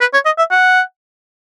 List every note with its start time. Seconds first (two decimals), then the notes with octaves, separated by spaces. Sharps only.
0.01 B4
0.13 C#5
0.25 D#5
0.38 E5
0.51 F#5